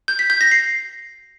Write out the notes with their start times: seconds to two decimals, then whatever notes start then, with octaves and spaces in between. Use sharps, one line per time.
0.08 G6
0.19 B6
0.30 G6
0.41 A#6
0.51 C7